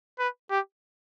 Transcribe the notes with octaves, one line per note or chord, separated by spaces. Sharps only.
B4
G4